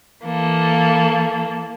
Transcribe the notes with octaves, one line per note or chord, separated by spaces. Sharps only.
E3 A#3 A4